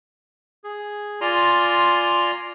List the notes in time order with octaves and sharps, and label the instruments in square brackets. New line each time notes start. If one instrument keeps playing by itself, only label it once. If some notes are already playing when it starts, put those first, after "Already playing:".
[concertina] G#4
F4 D5 G#5 A#5 C6